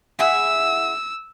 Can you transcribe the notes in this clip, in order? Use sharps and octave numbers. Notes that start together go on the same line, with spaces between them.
E4 G#4 F#5 E6